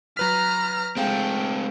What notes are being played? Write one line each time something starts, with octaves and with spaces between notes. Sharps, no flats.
F#3 B4 A#5 F6 B6
G#3 A3 C4 F5 G5